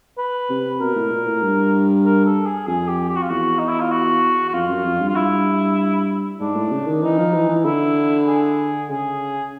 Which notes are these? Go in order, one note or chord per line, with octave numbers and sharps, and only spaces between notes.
B4
C3
B2 A#4
A2
A#2
A2
G2
A#4
A4
G#4
F2 G#4
G4
G4
F#4
F4
E2 F#4
D#4
E4
F4
F#4
F#4
F2 F4
F#2
F2
G2
F4
G2 E4
G#2 D4
A2
C#3
D#3
E3 D#4
F3
E3
E3
D3 E4
G#4
C#3 G#4